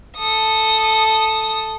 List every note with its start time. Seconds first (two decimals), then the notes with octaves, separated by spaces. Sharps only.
0.17 A4 D#6